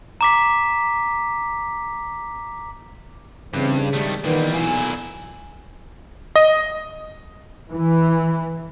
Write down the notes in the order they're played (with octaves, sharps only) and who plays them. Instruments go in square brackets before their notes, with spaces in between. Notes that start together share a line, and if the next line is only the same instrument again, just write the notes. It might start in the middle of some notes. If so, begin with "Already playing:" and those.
[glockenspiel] A#5 D6 B6
[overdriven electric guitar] G2 [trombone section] C#3 [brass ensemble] E3 C4
[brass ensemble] G#2 G3 [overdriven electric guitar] D#3 A3
[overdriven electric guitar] A#2 G3 [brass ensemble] D#3 B3 [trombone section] E3
[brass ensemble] B1 G#5 [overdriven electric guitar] A#2 E4
[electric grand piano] D#5
[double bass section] E3